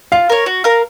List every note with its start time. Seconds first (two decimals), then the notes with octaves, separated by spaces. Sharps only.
0.12 F4 F5
0.29 A#4 C#5
0.46 F#4
0.64 A#4 F5